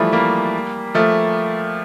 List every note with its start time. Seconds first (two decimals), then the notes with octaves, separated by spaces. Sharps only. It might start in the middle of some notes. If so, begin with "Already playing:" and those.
Already playing: E3 F3 G3 A3
0.12 G3 A#3
0.95 F3 A3